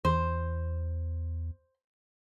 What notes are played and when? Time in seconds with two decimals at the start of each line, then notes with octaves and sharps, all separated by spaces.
0.05 E2 C5